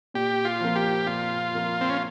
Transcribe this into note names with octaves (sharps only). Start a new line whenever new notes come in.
A#2 G4
F4
F3 A#3
G4
A#2 F4
F3 A#3
C4
C#4